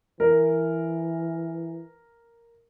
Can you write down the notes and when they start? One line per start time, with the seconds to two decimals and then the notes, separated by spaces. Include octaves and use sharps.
0.20 E3 A#4